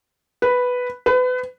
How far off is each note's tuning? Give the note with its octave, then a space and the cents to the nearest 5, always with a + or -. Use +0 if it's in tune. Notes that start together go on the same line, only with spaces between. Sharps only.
B4 +0
B4 +30